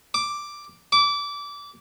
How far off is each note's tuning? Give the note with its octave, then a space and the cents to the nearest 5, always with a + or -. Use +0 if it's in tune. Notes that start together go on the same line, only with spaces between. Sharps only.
D6 +0
D6 -25